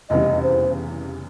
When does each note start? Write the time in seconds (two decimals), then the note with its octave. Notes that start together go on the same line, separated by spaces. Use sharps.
0.09 F1 E2 C#3 E3 G3 D#5
0.43 C5